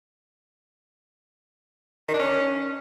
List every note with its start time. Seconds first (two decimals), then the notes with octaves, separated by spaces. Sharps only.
2.08 D#3
2.14 D4
2.19 C#4